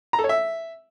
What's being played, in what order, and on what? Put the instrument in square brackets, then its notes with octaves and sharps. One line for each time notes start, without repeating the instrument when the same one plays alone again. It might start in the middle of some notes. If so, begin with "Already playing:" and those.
[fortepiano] A#5
A4
C#5
E5